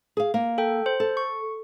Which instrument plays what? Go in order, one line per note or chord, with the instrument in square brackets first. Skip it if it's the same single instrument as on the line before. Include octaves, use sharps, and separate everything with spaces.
[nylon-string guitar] G#4 F5
A#3
[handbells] A4 G5
C5
[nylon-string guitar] A4
[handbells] C#6